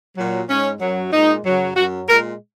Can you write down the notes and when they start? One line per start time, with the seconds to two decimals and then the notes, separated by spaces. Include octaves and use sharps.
0.18 A#2 F#3
0.49 G#2 G#3 C#4
0.81 F#2 F#3
1.13 A#2 G#3 D#4
1.45 F#2 C#3 F#3
1.76 F#2 F#3 F#4
2.09 A#2 G#3 A#4